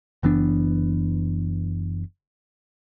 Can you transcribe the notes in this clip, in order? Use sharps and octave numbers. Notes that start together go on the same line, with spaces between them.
F#1 E3 B3 D4